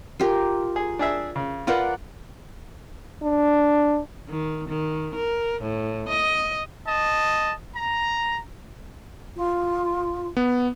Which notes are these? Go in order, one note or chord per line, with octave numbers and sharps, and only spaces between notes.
F4 G4 A#4
G#4
D4 G#4 E5
C#3
F4 A#4 B4 D5 F#5
D4
D#3
D#3
A#4
A2
D#5
D#5 A5
A#5
F4
B3